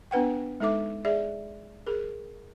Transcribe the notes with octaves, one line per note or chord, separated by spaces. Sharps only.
B3 D4 B4 F#5 G5
G#3 D#4 A4 E5 D6
G#4 D5 E5
G#4 A#4